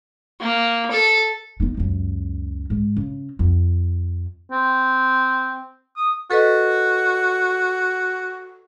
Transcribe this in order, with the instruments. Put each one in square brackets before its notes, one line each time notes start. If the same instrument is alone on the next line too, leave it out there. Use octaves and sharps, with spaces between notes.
[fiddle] A#3
A4
[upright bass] B3 D#4
C#2 F#2
G#2
C#3
F2
[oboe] C4
D#6
[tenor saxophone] F#4 [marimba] A4 B4 D#5